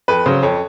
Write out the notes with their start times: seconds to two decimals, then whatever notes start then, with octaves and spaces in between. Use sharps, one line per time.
0.08 F2 B4
0.26 C#3 F#3 C5
0.43 F2 C#5